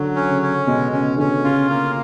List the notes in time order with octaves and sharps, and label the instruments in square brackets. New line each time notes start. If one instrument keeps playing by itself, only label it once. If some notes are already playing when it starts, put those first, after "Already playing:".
Already playing: [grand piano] D3 [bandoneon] F#3
[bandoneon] C#4
[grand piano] C#3
[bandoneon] C#4
[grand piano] B2 [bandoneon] G#3
[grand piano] C#3 [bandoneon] C#4
[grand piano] D3 [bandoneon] C#4
[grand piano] C#3 [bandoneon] F4
[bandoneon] A#3